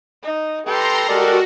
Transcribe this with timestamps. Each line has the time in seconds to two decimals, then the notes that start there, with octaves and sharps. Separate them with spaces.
0.23 D#4
0.67 G4 A4 B4 G5 A#5 C6
1.09 G#3 F#4 G4 A4 A#4 D5